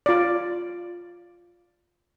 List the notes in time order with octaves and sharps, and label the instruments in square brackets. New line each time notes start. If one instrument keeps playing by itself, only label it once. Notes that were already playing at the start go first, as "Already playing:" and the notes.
[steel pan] F4 D5